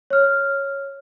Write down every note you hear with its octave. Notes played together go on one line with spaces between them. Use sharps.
C#5 F6